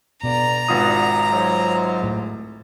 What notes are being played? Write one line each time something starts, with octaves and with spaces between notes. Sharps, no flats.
G2 B2 D3 D5 A#5
G#1 G2 F4 F#5 D#6
G#2 F#3
A2